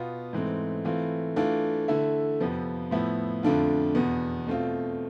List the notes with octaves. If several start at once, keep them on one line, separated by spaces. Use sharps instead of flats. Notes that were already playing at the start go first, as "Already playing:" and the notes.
Already playing: B2 B3 F4
G#2 E3 A3 C4
E3 A3 C4 F4
E3 A3 D4 F4
D3 A3 E4
F2 C3 F3 B3
A2 F3 B3 E4
F2 D3 A3 D4 F4
E2 B2 B3
B2 A3 C4 F4